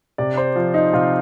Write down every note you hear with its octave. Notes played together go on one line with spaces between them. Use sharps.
C3 D5
C5
F3 F4
D#4
C3 F4